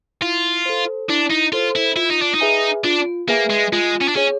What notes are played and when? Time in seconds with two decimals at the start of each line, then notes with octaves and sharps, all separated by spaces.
0.22 E4 F4
0.66 A4 C5
1.09 D4 E4
1.31 D#4
1.53 F4 A4 C5
1.76 E4
1.96 E4 F4
2.10 D#4
2.22 D4
2.34 D#4
2.41 G#4 B4 E5 G#5
2.84 D4 F4
3.28 A#3 G#4 B4 E5 G#5
3.50 G#3
3.72 G#3 F4
4.01 C#4
4.08 D4
4.16 C#4 G#4 C#5